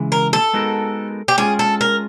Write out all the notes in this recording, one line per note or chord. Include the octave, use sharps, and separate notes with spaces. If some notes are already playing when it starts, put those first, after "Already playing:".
Already playing: C#3 E3 G#3
A#4
A4
G#3 B3 D#4 F#4 A#4
G4
G#3 C#4 F4 G#4
A4
A#4